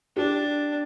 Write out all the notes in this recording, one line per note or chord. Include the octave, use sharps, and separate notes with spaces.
D4 G4